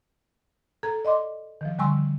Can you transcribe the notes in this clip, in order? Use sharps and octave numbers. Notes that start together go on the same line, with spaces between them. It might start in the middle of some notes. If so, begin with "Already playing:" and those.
A4 A#5 G#6
D5 D#5 C6 D6
D#3 F3
D3 G3 G#5 C6 C#6 E6